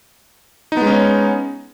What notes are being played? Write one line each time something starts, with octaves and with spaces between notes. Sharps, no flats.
G#3 B3 C#4 D#4